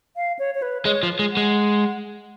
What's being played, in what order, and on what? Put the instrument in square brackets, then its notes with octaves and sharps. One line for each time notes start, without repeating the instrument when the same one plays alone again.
[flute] F5
C#5
C#5
B4
[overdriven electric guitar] G#3 [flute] C#5
[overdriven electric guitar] F3
G#3
[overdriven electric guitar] G#3 [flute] F#5